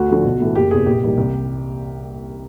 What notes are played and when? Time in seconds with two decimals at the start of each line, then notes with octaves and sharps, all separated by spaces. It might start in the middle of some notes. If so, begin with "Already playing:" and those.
Already playing: D2 F#4
0.09 D3 F3
0.25 B1
0.40 A2 E3 A3
0.55 F#1 G4
0.71 E2 C3 G#4
0.86 A#1 G4
1.02 G#2 E3 G3 A#3
1.17 C2